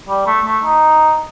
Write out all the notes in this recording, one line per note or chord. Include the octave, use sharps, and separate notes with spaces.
G3
A3
A3
D#4